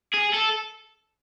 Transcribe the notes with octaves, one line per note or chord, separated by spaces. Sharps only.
G#4
A4